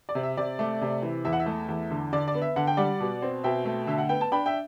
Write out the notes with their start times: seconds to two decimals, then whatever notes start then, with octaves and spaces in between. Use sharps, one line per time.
0.09 D5
0.15 C3
0.23 E5
0.37 C3 D5
0.59 A3
0.81 C3
1.02 E3
1.25 E2 E5
1.33 F#5
1.40 E5
1.46 A3
1.69 E2
1.91 D3
2.13 D3 D5
2.28 D5
2.34 B3
2.42 E5
2.56 D3 F#5
2.67 G5
2.77 G3 D5 F#5
3.00 B2
3.22 C4
3.44 B2 E5 G5
3.65 A3
3.87 D3 E5
3.98 F#5
4.09 B3 G5
4.21 A5
4.32 D4 G5 B5
4.46 E5 G5